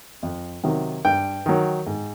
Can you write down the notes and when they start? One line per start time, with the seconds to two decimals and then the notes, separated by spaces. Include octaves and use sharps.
0.23 F2
0.64 C3 D#3 F#3
1.05 G2 G5
1.46 D#3 F#3
1.87 G#2